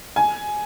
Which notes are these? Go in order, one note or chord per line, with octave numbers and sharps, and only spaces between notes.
G#5